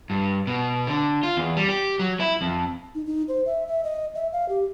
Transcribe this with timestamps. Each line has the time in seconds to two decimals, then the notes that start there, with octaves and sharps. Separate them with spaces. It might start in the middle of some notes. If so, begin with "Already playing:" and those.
0.10 G2
0.47 B2
0.87 D3
1.23 F4
1.37 E2
1.57 G3
1.69 G4
1.99 F#3
2.20 E4
2.41 F2
2.95 D#4
3.07 D#4
3.28 C5
3.46 E5
3.67 E5
3.84 D#5
4.15 E5
4.32 F5
4.49 G4